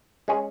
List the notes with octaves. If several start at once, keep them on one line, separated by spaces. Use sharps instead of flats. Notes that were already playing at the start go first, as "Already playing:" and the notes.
G#3 C#4 G#4